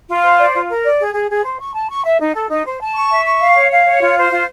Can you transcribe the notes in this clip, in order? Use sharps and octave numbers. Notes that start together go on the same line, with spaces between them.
F4
C5
D5
F4
A#4
D5
G#4
G#4
G#4
C5
C#6
A5
C#6
E5
D#4
A4
D#4
C5
A5
C#6
E5
C#6
F5
C#5
F5
C#5
F4
C5
F4